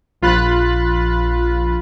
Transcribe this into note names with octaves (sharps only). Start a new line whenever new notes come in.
A#1 F4 B5 F#6 A6